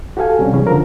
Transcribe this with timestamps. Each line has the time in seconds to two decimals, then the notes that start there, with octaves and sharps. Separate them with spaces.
0.17 F#4 G4 A4 F5 G#5
0.39 C3 G3 C#4
0.53 E3 C#4 G#4
0.67 D3 F3 A#4